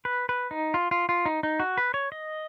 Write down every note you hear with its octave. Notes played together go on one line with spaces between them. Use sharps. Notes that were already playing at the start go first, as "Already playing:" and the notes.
B4
B4
D#4
F4
F4
F4
D#4
D#4
F#4
B4
C#5
D#5